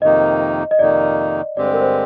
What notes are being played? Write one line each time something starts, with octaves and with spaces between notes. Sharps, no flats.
F2 C3 D#3 A#3 D#4 D#5
D#5
F2 C3 D#3 A#3 D#4 D5
G2 D3 G#3 C4 G4 D5
C5
A#4
C5